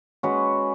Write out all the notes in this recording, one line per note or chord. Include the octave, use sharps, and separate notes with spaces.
G#3 C#4 F#4 B4